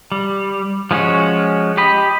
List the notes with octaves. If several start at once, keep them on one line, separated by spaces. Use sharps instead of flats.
G3
F3 G#3 C#4 F#4
G4 D#5 B5